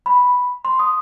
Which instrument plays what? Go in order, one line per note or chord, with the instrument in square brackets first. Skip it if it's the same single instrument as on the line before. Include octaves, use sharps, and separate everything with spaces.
[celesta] B5
C6
D#6